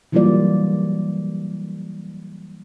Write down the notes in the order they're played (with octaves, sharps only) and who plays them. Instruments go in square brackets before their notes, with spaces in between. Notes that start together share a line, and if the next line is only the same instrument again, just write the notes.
[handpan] E3 F#3 G3 A#3 F4 D5